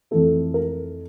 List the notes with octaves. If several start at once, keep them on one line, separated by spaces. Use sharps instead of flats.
F2 E3 A3 A4
A#4